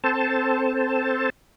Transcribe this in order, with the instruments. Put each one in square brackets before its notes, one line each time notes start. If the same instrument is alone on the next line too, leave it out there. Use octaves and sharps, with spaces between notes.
[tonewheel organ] C4 A4 C5 A5